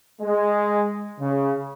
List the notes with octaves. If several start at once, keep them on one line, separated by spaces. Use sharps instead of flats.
G#3
C#3